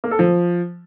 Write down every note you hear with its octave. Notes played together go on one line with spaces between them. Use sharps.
A#3
A4
F3